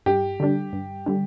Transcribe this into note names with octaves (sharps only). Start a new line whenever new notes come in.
G2 G4
D3 G3 D4
G2
D3 G3 D4